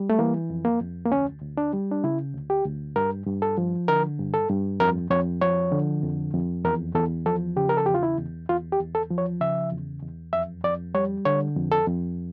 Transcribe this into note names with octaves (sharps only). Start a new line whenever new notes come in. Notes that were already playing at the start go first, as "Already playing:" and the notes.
Already playing: G3
A3
E3 A#3
F2
A#3
F2
A#3
D2 C#4
D2
D4
G3
D4
C#3 E4
D2
G4
D2
G2 A#4
G2
A4
F3
D3 A#4
G2
A4
G2
F2 A#4
F2 C#5
F3 C#5
D3
F2
F2
E2 A#4
E2 A4
F3 A4
C#3 G4
A#4
A4
E2 G4
F4
E4
E2
E2 F4
G4
E2
A4
F3
C#5
C#3 E5
E2
E2
F2 E5
F2 D5
G3 C#5
D3 C#5
F2
A4
F2